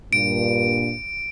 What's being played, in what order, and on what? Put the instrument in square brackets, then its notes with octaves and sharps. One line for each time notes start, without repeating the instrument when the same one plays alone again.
[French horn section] G2 A#2 [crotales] D7